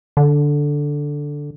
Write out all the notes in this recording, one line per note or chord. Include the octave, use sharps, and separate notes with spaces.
D3